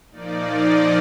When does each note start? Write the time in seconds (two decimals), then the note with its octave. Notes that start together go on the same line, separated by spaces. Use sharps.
0.11 A#2 F3 A#3 D#4 D5
0.63 D#5